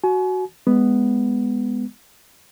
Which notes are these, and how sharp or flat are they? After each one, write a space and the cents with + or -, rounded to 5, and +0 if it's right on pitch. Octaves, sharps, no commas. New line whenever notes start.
F#4 +0 G#5 +35
G#3 -10 B3 +0